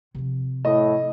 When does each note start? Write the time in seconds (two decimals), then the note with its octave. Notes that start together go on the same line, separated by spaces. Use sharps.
0.15 C3 F3
0.65 A2 D#5